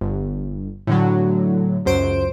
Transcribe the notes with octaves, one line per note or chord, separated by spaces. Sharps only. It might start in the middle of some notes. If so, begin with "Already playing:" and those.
G1
A2 D3 F#3
C#2 F#2 C5 D7